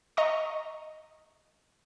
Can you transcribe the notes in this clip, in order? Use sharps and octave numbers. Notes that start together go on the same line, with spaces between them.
D#5 A#5 C#6